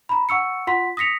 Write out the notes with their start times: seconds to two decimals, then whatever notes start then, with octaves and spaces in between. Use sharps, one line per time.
0.09 A#5 B5
0.29 F#5 C#6 E6 C#7
0.67 F4 F#5 C6 B6
0.97 D#6 A#6 B6 C#7 F7